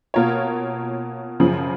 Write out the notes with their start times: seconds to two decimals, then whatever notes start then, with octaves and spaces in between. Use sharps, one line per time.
0.14 B2 A#3 F4 A#4 C#5
1.40 F#2 C#3 F3